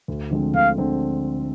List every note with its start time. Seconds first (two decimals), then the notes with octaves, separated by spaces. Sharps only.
0.08 D2
0.31 D3 F3 G#3 C4
0.54 D2 F5
0.78 D3 F3 G#3 C4